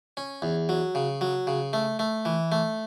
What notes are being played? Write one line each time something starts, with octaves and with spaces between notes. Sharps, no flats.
C#4
E2
F#3
C#3
F#3
C#3
A3
A3
E3
A3